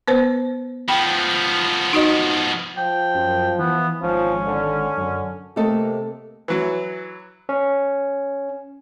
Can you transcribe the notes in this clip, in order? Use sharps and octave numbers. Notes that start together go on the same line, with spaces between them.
B3 B4 C5
F3 B3 G5 B5
D#4 F#4 D#5
F3 G5
F#2
E3 B3
G#1 F3 C#4
D3
F#2 D3
C3 A3 A#3 A4 D#5
E3 F#3
C#4